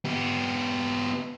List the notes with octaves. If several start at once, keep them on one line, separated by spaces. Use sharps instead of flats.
B3 G4